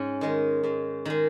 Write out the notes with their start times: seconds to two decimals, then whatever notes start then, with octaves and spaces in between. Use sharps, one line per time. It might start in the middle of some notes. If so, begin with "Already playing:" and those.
Already playing: G#2 C#4
0.21 D#3 G#3
0.64 G#2
1.05 D#3 G#3